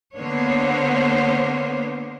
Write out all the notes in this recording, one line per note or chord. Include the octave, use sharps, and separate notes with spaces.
D3 A#3 B3 C5 C#5